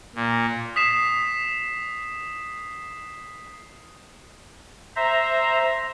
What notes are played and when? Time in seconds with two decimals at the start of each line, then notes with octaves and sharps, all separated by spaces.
0.15 A#2
0.76 D#6 B6 C7 E7
4.96 C5 E5 A#5